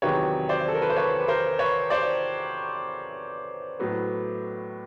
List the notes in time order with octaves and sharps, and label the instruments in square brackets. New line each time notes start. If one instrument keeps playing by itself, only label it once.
[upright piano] E2 C3 D#3 F#3 B4 C#5
C5 D5
A4
A#4
B4
C5
B4 C#5
B4
A#4 C5
B4 C#5
C5 D5
A2 F#3 B3